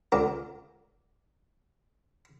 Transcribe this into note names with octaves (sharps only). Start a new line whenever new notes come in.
C#2 D3 A#5